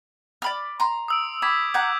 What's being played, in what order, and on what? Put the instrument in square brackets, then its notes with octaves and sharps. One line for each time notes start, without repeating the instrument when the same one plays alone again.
[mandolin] D5 B5 F6
A#5 C6
[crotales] D#6 E6 D7
[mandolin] B5 [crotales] D6 G#6 B6
[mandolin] F#5 A#5 [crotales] G6 G#6